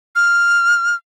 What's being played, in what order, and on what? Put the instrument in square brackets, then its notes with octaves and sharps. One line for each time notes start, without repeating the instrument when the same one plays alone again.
[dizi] F6